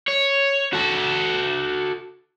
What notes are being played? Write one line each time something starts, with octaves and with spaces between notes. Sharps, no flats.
C#5
F#4 A4